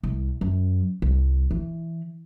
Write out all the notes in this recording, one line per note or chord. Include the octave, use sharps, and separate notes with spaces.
C2
F#2
C2
E3